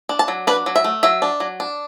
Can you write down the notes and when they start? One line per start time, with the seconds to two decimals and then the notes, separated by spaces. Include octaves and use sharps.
0.09 D4
0.19 A5
0.28 F#3
0.47 D4 B4
0.66 F#3
0.76 E5
0.84 A3
1.03 F#3 E5
1.22 D4
1.40 F#3
1.60 D4